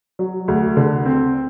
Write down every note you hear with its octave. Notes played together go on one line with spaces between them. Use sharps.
F#3
D2
D3
C4